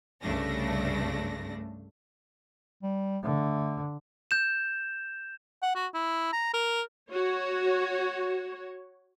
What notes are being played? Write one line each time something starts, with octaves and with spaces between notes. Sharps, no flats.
C2 G2 C#3 A3 D4 A#6
G3
D3 A3
G6 E7
F#5
F#4
E4
A#5
A#4
F#4 C#5